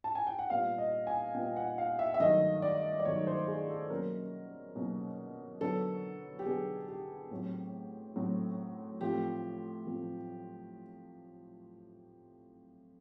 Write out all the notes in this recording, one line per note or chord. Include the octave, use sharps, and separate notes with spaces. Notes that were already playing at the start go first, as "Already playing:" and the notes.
A5
G#5
G5
F#5
A#2 G3 B3 F5
D#5
G#5
A#2 G3 B3 G5
F#5
F5
E5
E5
G2 D#3 F#3 A3 D#5
D5
D5
G2 D#3 F#3 A3 C#5
C5
G#4
A4
B2 F#3 A#3 C#4 A#4
B2 F#3 A#3 C#4
D3 F#3 B3 A4
G4
D3 F#3 B3 G#4
G4
A2 F#3 A3 C4
A2 F#3 A3 C4
A2 F3 A3 C4 G4
A2 F3 A3 C4